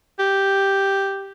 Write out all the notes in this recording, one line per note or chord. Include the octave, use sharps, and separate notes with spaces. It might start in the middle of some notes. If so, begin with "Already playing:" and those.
G4